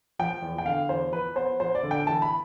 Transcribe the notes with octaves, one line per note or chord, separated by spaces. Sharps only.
F3 G5
E2
G5
D3 F5
E2 C5
F3 B4
B3 C5
F3 C5
D5
D3
G5
E3 A5
B5